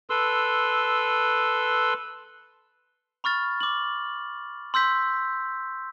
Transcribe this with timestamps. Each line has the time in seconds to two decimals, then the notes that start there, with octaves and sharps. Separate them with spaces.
0.10 A4 B4 C6 E6
3.24 B5 C#6 F6 A6
3.61 D6 F#7
4.74 C6 E6 G6 B6